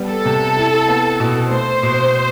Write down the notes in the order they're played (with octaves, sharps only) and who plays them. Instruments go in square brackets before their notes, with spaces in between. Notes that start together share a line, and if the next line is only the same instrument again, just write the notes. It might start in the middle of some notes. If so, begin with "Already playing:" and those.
Already playing: [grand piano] G3 B3
[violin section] A4
[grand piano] C3
E4
B3
B2
[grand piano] A3 [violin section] C5
[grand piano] B2